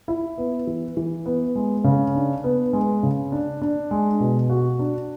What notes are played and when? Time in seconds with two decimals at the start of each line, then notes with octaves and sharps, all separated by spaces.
0.08 E4
0.38 B3
0.67 E3
0.97 E3
1.26 B3
1.56 G#3
1.84 C#3
2.15 D4
2.44 B3
2.73 G#3
3.03 C#3
3.32 D4
3.62 D4
3.91 G#3
4.20 B2
4.50 F#4
4.79 D4